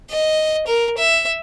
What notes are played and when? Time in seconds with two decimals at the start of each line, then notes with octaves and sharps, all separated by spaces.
0.10 D#5
0.67 A#4
0.97 E5